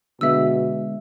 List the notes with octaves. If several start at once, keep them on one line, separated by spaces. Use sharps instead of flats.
B2 D3 G#3 B3 E5 E6